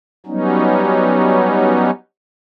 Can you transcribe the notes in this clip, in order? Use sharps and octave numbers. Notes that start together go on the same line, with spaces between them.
F#3 G3 B3 C#4 D#4